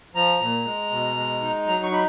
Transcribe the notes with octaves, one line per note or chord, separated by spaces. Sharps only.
F3 A#5
A#2
G#3
B2
G#3
D#4
F#3 A#5
C#6
D#4 B5